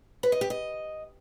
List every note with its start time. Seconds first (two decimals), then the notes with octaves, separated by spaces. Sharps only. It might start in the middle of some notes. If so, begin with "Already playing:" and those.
0.23 B4
0.32 D#5
0.41 G4
0.50 D#5